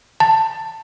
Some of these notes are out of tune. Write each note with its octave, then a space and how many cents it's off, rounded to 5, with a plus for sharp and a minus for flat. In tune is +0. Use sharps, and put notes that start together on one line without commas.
A5 +15